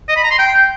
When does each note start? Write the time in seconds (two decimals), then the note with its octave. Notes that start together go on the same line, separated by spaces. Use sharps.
0.09 D#5
0.16 B5
0.24 A#5
0.31 C6
0.39 G5